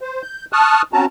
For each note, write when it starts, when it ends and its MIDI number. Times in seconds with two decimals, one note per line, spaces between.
0.01 0.22 72
0.23 0.45 91
0.53 0.82 81
0.53 0.82 85
0.53 0.82 87
0.53 0.82 89
0.53 0.82 90
0.93 1.06 60
0.93 1.06 61
0.93 1.06 66
0.93 1.06 81
0.93 1.06 82